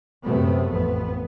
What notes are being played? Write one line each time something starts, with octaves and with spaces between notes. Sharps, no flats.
F#2 C3 A3 B3
A1 F2 B3